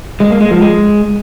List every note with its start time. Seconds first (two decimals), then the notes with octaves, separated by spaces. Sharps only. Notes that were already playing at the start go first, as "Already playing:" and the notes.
0.20 G#3
0.31 A#3
0.41 G#3
0.51 F3
0.61 G#3